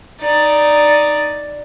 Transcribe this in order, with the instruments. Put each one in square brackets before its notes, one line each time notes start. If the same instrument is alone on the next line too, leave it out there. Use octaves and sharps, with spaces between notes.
[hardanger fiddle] D#4 D5